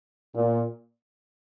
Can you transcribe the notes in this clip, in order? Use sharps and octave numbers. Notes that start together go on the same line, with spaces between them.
A#2